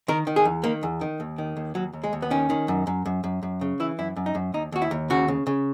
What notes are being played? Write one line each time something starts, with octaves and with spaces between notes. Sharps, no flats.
D#3 A#4
D#3
G#4
E2
D#3 A#3
E2
D#3
D#2
D#3
D#2
D#2 F#3
D#2
G#3
D#2
B3
D#3 C#4
D#3
F#2
F#2
F#2
F#2
F#2
C#3
E3 E4
F#2 E4
F#2
D#4
F#2
D#2 D#4
D#2 F#4
E4
D#2
C#3 F#4
C#3
C#3